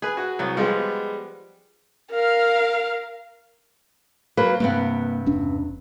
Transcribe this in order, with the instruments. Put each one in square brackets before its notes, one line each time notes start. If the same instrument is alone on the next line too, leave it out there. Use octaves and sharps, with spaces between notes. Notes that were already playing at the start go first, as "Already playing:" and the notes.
[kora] G#4 B4 [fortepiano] G#5
[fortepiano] F#4
[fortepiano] C2 [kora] F#3 B3
[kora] F3 F4 [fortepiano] G3 G#3 B3
[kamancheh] A#4 F5
[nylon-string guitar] F#3 A#3 B4
[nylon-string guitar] G2 C3 B3 [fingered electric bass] A#3
[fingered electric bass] E1 C#4 D4